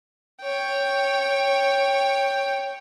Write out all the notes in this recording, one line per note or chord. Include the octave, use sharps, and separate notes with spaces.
C#5 G5